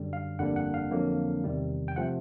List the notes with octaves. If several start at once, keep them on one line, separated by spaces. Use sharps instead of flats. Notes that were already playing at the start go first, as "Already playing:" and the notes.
Already playing: F#2 D3 G3
F5
G1 F2 D3 G3 A#3 F#5
F#5
F5
F2 D3 F#3 A#3
E2 C3 D#3 G3
G5
C3 F3 A3 F#5